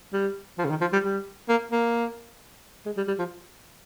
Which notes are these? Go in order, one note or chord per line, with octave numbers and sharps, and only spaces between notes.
G3
F3
C#3
D#3
F3
G3
G3
A#3
A#3
G#3
G3
G3
F3